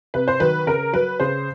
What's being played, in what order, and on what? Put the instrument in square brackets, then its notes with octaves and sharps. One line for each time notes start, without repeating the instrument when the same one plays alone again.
[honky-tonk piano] C3 B4
C5
D#3 F#3 B4
C#3 A#4
F#3 B4
C#3 C5